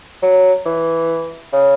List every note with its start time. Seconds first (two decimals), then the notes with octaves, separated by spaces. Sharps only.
0.22 F#3
0.66 E3
1.53 C#3